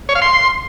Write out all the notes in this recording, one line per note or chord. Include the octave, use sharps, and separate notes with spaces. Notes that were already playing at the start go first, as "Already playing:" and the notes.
C#5
F5
C6